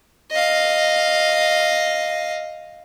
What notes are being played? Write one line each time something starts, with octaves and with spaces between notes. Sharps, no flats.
D#5 F5